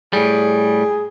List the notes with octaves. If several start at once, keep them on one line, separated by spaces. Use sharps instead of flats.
A2 G3 G#4